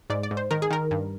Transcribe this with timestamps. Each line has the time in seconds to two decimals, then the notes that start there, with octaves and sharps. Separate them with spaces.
0.10 G#2 D5
0.23 D5
0.31 G#2
0.37 C5
0.51 D#3 A#4
0.62 G#4
0.71 D#3 A#4
0.91 G2